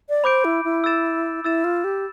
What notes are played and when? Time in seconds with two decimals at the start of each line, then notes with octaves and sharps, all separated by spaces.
0.09 D5
0.24 C5 B5 D6 G6 D7
0.45 E4
0.64 E4
0.84 E6 A6 E7
1.44 E4 E6 A6 E7
1.64 F4
1.84 G4